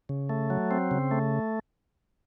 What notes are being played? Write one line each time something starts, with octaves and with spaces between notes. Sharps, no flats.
C#3
A3
F#3
C4
C#3
A3